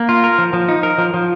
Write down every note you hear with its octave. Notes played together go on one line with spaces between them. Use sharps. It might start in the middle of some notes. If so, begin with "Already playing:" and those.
Already playing: A#3
F4
A#4
F3
F3
D#4
A#4
F3
F3